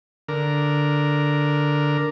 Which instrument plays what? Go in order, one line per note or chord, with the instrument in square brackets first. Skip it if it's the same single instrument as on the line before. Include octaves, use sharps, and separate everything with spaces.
[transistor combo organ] D3 A#4